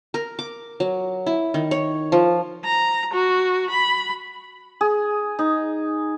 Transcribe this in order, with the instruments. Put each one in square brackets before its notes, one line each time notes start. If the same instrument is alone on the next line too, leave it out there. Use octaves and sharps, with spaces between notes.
[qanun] A#4
D6
F#3
E4
D#3
C#5
F3
[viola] A#5
F#4
B5
[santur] G#4
D#4